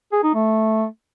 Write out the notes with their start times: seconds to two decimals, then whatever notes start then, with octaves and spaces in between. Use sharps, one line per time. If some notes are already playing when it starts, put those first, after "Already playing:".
0.13 G#4
0.24 D#4
0.35 A3